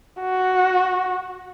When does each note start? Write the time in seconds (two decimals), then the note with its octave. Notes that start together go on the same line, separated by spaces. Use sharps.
0.20 F#4